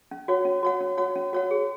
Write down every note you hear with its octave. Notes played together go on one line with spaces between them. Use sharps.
C#4
F#4 C#5 F#5
C#4
F#4 C#5 F#5
C#4
F#4 C#5 F#5
C#4
F#4 C#5 F#5
G#4